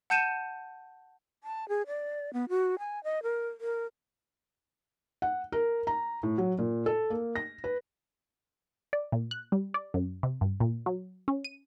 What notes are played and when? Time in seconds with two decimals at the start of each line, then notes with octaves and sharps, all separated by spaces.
0.10 F#5 A5 G6 C#7 D#7 E7
1.44 A5
1.69 G#4
1.87 D5
2.33 B3
2.49 F#4
2.79 G#5
3.04 D#5
3.23 A#4
3.61 A#4
5.22 F#5
5.52 A#4
5.87 A#5
6.23 A2
6.38 F#3
6.58 A#2
6.86 A4
7.10 A#3
7.36 A#6
7.64 B4
8.93 D5
9.12 A#2
9.31 F#6
9.52 G3
9.74 D5
9.94 F#2
10.23 C3
10.41 G2
10.60 A#2
10.86 F#3
11.28 C#4
11.45 D#7